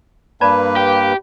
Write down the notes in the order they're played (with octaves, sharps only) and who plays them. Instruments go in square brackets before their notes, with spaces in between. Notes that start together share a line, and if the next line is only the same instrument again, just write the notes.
[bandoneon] G2 A#3 B4 [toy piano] D5 A5 B5
[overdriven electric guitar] G4